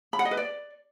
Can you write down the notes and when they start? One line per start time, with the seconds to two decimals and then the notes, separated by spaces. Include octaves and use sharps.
0.13 B5
0.19 F#5
0.25 D#5
0.31 B4
0.37 D5